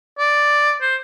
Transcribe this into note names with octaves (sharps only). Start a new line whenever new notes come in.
D5
C5